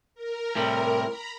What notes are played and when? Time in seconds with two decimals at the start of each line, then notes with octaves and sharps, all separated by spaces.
0.14 A#4
0.55 A2 C3 G3
1.05 A#5 B5